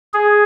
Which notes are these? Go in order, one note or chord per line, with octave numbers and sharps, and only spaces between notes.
G#4